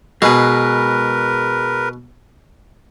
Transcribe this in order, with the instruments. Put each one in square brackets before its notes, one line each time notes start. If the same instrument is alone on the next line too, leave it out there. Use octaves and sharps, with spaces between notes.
[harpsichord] B2 [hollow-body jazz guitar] G#3 G#4 [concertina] A#4 B4